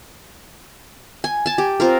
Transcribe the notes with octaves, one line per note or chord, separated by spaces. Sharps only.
G#5
G#5 A5
G4
C4 F4 A#4